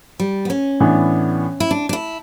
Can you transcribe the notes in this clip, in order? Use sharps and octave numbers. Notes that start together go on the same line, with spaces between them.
G3
B3
C#4
A2 E3 B3 D4
E4
D4
D4
E4